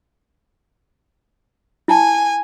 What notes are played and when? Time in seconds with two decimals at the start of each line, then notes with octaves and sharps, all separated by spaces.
1.88 E4 G#5 A5